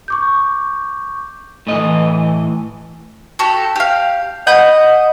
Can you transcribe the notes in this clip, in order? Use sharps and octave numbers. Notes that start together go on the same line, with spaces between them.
C#6 D6 G6
A2 E3 D#5
F#4 G4 A4
G4 F5
D#5 F#5 B5 G6